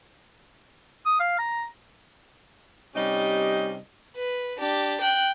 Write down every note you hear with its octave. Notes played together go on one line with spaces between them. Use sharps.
D#6
F5
A#5
C3 G3 C#4 D#4 G4 D#5
B4
D4 G4
G5 F#6